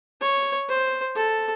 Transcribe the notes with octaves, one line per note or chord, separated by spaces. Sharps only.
C#5
C5
A4